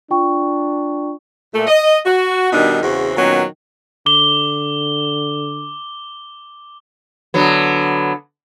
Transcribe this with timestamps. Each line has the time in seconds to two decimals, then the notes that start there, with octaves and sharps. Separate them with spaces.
0.11 D4 F4 G5 C#6
1.54 A#2 A3
1.67 D#5
2.05 F#4
2.53 B2 D#3 G3 D4 D#4
2.83 E2 C#3 C4 F#4
3.17 A#2 D#3 F#3 B3 C#4
4.06 D3 D6 G7
7.34 D3 F#3 B3